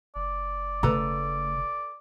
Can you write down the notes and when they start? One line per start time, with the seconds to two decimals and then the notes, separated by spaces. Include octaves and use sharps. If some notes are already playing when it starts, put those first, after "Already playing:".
0.16 F#1 D5
0.83 C#3 A3 A4 B4 A#5